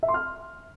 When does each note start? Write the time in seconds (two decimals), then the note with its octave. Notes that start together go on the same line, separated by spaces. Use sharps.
0.03 E5
0.08 C6
0.14 F6